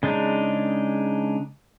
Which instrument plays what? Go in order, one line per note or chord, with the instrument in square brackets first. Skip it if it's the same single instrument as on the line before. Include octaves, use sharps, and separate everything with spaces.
[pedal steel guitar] C#3 G#3 D4 D#4